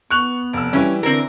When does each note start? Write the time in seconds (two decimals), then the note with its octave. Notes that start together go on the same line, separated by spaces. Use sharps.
0.10 B3 C#6 F#6 F7
0.53 F1 E6
0.73 E3 G3 C#4 E4 B4
1.03 D3 C4 A#4